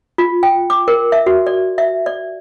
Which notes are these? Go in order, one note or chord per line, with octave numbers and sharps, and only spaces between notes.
F4
G5
D6
A#4
E5
F#4
D5
E5
D5